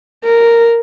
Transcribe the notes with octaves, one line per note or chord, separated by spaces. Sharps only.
A#4